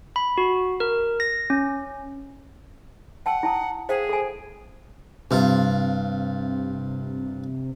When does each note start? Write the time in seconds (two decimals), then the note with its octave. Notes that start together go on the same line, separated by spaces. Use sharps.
0.16 B5
0.38 F#4
0.80 A#4
1.20 A#6
1.50 C#4
3.26 F#5 G5 A5 E6
3.43 E4 A5 D#6
3.89 G#4 C5 F5 G5
4.09 A4 G#5
5.31 G2 C3 F4